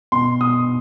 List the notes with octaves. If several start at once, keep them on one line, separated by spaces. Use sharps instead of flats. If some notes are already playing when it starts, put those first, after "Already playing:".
B2 C6
B2 D#6